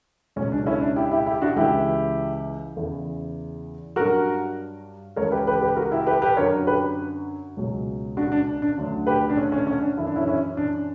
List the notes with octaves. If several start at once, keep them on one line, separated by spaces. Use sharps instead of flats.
C#2 B2 F#3 C#4
D4
C#4 E4
D4
E4 G4
E4 G4
E4 G4
D4 F#4
C#2 C#3 E3 E4 G4
E2 C#3 E3
G2 F#3 F#4 A#4
C#2 C#3 E3 A#4 C#5
G4 B4
G4 B4
G4 B4
F#4 A#4
E4 G4
G4 B4
G4 B4
F#2 D3 F#3 A#4 C#5
G4 B4
C#2 B2 F#3
D4 F#4
D4
D4
D2 D3 F#3
G4 B4
D4
C#4
C#4
C#4
D4
F#2 E3 E4
D4
C#4 E4
C#4 E4
D4